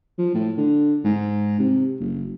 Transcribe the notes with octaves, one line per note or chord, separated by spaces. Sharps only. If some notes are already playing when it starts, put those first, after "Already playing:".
F3
A2
D3
G#2
C3
F#1